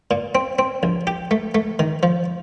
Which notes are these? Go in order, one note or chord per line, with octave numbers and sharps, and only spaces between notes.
A#2
C4
C4
A#1
G4
A3
A3
D#3
F3